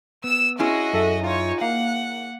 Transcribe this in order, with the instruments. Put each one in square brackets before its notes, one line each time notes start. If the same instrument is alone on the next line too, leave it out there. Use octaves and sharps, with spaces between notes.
[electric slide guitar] B3 [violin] E6 E7
[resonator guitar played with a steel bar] C#4 E4 G#4 [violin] F#4 D#5
[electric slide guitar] F#2 E5 [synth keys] A4
[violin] D#4 C#5 [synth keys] F4
[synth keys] A#3 [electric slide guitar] F5 [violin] F#5